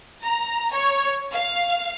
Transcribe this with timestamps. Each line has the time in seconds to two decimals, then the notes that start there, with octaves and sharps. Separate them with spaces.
0.23 A#5
0.73 C#5
1.34 F5